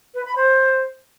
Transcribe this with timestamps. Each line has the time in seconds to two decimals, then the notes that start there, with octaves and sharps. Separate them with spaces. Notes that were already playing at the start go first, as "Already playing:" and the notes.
0.14 B4
0.25 B5
0.36 C5